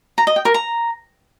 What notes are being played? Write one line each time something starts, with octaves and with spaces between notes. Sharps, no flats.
A#5
D#5
G5
A#4
A#5